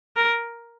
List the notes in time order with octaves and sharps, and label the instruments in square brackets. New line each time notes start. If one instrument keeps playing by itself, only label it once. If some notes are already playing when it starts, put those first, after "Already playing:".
[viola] A#4